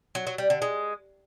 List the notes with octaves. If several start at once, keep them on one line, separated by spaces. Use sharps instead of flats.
F#3
F#3
G3
D3
G#3